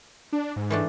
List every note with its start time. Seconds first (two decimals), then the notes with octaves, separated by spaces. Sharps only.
0.33 D4
0.56 G#2
0.70 E3 A3 D4